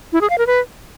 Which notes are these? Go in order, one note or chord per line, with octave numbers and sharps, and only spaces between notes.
E4
G#4
F5
A#4
B4